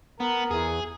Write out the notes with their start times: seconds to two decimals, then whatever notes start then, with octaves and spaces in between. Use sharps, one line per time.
0.20 B3 A#4
0.51 E2 G#4